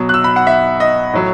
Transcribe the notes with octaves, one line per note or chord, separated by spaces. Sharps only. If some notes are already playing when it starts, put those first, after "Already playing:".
Already playing: B2 F#3
F#6
E6
B5
F#5
E5
D#5
A2 F#3